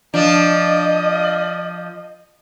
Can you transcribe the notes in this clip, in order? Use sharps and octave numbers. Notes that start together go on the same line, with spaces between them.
F3 D4 D#5